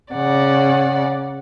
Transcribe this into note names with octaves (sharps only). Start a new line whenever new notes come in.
C#3 D5 F#5